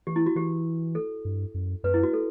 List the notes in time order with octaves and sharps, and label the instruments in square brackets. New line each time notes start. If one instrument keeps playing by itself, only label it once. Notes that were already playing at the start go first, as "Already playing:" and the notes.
[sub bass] E3 [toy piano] G4
[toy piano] E4
F#4
[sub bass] E3 [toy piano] G4
[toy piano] A4
[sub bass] G2
F#2
[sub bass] F#2 [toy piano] B4
[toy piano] E4
F#4
A4